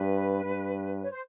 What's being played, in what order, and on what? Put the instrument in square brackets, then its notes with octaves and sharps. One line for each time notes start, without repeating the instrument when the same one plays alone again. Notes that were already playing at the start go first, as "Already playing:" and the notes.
Already playing: [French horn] G2 [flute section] B4
[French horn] G2
[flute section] C#5
C5